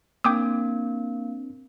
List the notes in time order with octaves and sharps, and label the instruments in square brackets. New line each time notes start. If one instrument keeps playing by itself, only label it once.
[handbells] A#3 [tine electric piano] C4 D4 [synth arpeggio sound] G5 D6 D#6